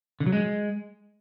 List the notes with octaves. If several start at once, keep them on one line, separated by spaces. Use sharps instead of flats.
D3
F#3
G#3